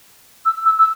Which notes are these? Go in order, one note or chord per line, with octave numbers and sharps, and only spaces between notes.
E6
E6
E6